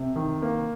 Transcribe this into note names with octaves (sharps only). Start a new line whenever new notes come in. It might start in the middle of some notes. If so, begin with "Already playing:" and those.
Already playing: C3
D#3
A#3